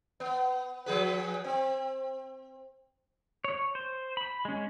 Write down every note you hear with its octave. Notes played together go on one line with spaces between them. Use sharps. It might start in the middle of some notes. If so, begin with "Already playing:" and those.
B3
F3 G#4 B4
C4
C#5
C5
B5
G#3 C#4